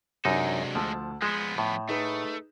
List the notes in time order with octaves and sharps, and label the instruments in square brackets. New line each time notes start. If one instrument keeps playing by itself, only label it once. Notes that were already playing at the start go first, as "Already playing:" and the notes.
[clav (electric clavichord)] F#2 D#4 [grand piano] C3 F#3 D4 [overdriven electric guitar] G#3 A4
[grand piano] D2 A5 E6 [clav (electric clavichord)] F3
[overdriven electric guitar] F3 B3 [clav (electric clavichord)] G#3 [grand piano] G6 G#6 E7
[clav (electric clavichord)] A2
[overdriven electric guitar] A3 [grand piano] D#4 G#4 B4